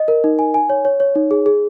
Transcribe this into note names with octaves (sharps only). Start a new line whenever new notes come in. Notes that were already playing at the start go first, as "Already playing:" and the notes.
Already playing: D#5
A#4
D#4
G#5
G#5
C#5
C#5
C#5
D#4
G#4
G#4